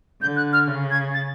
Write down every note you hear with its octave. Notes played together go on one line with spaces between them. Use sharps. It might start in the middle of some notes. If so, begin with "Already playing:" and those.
D3 G6
F#6
F6
C#3
G#6
A6